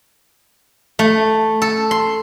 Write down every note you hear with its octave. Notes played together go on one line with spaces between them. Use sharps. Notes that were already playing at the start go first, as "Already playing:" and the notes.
A3
A4
C6